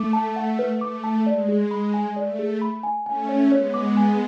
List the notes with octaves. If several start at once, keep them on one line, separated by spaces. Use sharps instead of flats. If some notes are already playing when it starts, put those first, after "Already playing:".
Already playing: A3 D6
A5
F#5
B4
A3 D6
A5
G#3 D5
G#4
B5
G#5
A3 D5
G#4
B5
G#5
A3 C#4 G#5
C#5
G#3 B3 C#5
D6
G#5